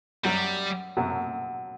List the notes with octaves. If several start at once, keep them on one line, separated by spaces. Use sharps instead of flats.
F#2 F#3 G3
F#2 F#3